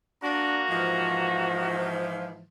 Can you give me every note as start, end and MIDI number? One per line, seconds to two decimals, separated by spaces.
0.23 2.02 58
0.23 0.60 62
0.23 2.02 66
0.23 2.02 82
0.70 2.46 44
0.70 2.46 52
0.70 2.46 53